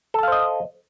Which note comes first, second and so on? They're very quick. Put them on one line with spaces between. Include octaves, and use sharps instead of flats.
A4 A5 F5 C5 D#5